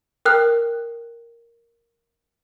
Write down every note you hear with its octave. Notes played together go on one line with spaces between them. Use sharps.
A#4 G5 F6 F#6